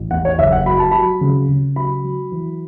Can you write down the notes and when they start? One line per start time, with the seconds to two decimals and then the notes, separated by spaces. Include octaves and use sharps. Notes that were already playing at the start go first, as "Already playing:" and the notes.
Already playing: A1
0.11 E2 F#5
0.25 C#5
0.38 F#1 E5
0.52 F#5
0.66 F#3 B5
0.79 A5
0.92 F#3 B5
1.21 C#3
1.49 C#3
1.76 F#3 B5
2.04 F#3
2.32 E3